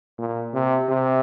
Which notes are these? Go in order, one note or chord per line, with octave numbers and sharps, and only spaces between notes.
A#2
C3
C3